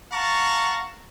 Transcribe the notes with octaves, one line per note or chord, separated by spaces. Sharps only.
F5 F#5 A5 A#5 C#6